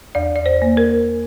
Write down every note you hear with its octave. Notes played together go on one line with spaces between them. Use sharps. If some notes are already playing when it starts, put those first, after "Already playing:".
E2 D5
D5
C5
A#3
A#4